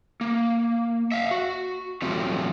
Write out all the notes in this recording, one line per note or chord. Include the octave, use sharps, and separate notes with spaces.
A#3
E5 F5
F#4
E3 F#3 G3 A3 C4 F4